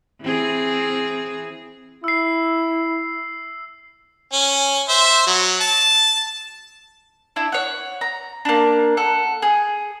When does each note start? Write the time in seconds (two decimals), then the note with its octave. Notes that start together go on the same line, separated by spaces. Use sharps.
0.22 E3 C4 G#4
2.04 E4 E6 C7
4.33 C#4
4.89 C5 E5
5.27 F#3
5.61 A5
7.36 D4 E4
7.52 C#5 F#5
8.01 A#5
8.45 A#3 D4
8.97 A4 F#5
9.42 G#4